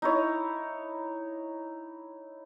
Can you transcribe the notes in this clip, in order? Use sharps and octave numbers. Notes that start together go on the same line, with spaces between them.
D#4 E4 C#5